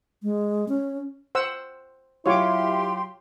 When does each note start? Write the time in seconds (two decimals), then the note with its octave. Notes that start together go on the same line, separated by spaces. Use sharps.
0.23 G#3
0.68 C#4
1.35 C5 F#5 E6
2.26 F#3 E4 F4 G4 C#5 C6 D6